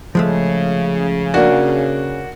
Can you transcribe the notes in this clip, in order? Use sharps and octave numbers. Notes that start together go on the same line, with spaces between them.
C#3 F3 G#3 A3
A#3 D4 F#4